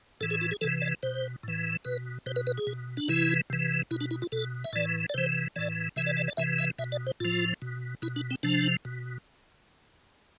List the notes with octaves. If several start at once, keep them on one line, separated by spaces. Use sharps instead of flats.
A2 E3 A4
G#4
F4
G#4
C3 E3 A4
D5
B2 C5
A2 E3
B2 B4
B2 C5
B4
B4
G#4
B2
D4
C3 E3 E4
C3 E3
B2 E4
D4
E4
F4
B2 A4
E5
A2 E3 D5
D5
C3 E3 C5
A2 E3 D5
C3 E3 E5
D5
D5
D5
C3 E3 E5
E5
B2 E5
D5
C5
A2 F3 F4
B2
B2 E4
D4
C4
C3 F3 D4
B2